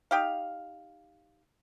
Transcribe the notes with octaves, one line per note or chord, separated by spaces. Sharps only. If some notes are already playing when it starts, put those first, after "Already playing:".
D#4 G4 F5